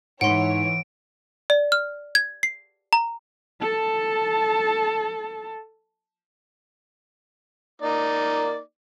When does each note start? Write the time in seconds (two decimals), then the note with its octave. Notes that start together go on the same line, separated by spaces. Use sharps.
0.21 G#2 E3 C#5 F#5 C6 D7
1.50 D5
1.72 F6
2.15 G#6
2.43 C7
2.93 A#5
3.61 A4 A5
7.82 A#3 D#4 D5